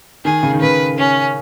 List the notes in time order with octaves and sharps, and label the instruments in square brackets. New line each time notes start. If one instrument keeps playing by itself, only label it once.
[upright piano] D#3 [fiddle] G#4
[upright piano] C#3
D#3
[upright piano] C#3 [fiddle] B4
[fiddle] C#4